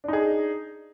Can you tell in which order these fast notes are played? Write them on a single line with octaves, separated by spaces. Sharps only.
D4 D#4 G#4